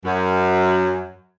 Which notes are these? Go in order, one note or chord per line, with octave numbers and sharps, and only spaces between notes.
F#2